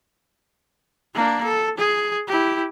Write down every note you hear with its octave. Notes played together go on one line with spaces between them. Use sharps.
A#3 D4
A4
G#4
E4 G4